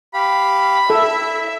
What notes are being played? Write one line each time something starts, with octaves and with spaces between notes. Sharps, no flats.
G4 F5 B5
E4 A4 E5